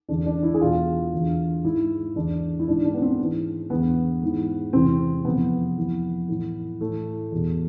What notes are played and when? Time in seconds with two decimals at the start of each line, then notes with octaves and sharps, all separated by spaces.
0.09 E2 D3 D4
0.26 D4
0.43 E4
0.54 G#4
0.60 E2 B2 F4
1.13 E2 D3
1.64 G#2 E3 E4
2.15 E2 D3 D4
2.60 E4
2.68 G#2 E3 D4
2.85 D4
2.94 B3
3.02 C4
3.19 G#2 E3
3.70 E2 D3 B3
4.23 G#2 E3
4.73 E2 C3 E3 C4
5.25 F2 C3 E3 B3
5.78 F2 E3
6.28 A2 E3
6.81 A2 E3 A3
7.32 E2 B2